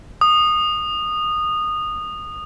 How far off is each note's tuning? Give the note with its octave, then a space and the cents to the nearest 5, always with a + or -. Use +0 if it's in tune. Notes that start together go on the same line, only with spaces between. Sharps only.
D#6 -20